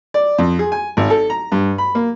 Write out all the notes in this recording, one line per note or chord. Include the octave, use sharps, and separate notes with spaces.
D5
F2
G#4
G#5
G#1
A4
A#5
G2
B5
A#3